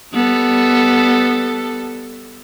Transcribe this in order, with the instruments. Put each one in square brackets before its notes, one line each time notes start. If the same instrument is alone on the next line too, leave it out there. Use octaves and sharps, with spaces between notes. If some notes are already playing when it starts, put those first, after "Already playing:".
[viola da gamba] G3 B3 A4